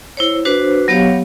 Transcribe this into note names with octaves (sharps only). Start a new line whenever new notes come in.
E4 C5 C#5
D4 F#4 B4 C5
F#3 B3 G4 C#5 F5